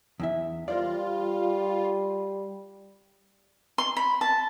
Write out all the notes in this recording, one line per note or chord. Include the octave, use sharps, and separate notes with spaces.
E2 E4 E5
G3 F4 A#4 C5 D5
C6
B5
A5